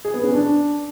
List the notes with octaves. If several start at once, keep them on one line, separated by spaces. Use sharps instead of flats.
G#4
B3
C#4
D4